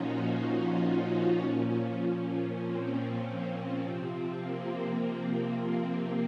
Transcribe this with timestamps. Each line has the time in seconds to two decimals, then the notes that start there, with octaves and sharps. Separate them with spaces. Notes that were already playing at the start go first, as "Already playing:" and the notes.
Already playing: A#2 F3 C#4 D#4 F4 F#4
0.22 F4
1.12 C#4
1.42 A#2 F3 C#4
2.02 C#4
2.61 C4
3.21 C4
3.80 C3 F3
4.40 A#3
4.70 C4
5.00 A#3